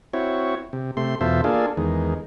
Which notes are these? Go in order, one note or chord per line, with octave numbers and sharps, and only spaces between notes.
C4 E4 F#4 C#5
C3
C3 A3 C6
E2 B2 F4 A4 C5 E5
A#3 D4 F4 G#4 A4
E2 D#3 G#3